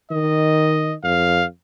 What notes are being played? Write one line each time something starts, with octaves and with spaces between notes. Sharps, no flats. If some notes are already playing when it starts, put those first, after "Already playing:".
D#3 D#5
F2 F5